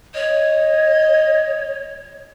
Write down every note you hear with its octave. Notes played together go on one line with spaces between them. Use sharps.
C#5 D#5